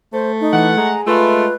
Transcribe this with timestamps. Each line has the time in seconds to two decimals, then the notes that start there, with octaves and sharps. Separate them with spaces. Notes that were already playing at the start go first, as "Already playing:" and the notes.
0.13 A3 C5
0.41 D#4
0.53 E3 F#5
0.77 G#3 A#5
1.07 A3 F4 B4